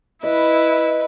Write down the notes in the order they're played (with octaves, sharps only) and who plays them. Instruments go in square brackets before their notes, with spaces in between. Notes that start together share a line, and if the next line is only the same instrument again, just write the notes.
[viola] E4 [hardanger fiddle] B4 [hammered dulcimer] D#5